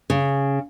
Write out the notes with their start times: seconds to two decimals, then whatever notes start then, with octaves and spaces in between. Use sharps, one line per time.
0.10 C#3